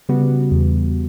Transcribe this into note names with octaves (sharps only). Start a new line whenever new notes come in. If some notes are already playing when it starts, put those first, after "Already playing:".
C#3 G3 B3 F#4
E2